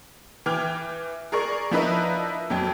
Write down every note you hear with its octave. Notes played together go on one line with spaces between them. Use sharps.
E3 G5 D6 F6 G#6
G#4 A#4 D5 C#6
F3 D4 E4 A#4 B4 D#5
F2 F#3 G5